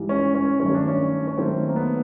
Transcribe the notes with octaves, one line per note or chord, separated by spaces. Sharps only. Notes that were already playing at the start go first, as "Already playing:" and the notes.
Already playing: G#2 E3 G3
C#4
C#4
G2 D#3 F#3 A3 C#4
D4
C#4
C#4
D#3 F#3 A3 C4
A#3
B3